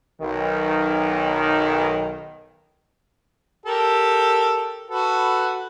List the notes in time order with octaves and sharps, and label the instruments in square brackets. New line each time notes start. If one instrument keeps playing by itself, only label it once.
[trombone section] B1 D#3
[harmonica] G4 A4 A#4
F#4 A4 B4